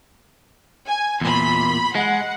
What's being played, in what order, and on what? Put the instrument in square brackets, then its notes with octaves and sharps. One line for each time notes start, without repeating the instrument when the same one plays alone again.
[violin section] G#5
[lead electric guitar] E2 A#2 [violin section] B5 C6
[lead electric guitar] G#3 [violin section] F#5